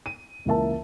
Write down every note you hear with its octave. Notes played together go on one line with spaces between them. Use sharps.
D#7
C#2 E3 A#3 A#4 E5 A5